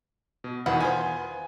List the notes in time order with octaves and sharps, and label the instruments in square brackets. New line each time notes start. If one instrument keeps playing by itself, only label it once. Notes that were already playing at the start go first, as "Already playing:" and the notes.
[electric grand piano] B2
[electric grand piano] E2 B2 D#3 [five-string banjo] B4 F#5
[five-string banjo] B3 F4 C5 [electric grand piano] G#5